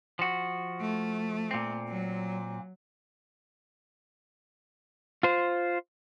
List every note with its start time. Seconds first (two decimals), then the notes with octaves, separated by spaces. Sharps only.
0.19 F3 F#4
0.81 A3
1.51 A#2 C4
1.88 F#3
5.23 F4 C5